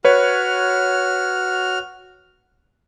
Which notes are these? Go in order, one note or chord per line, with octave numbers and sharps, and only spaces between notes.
F#4 B4 C#5 F6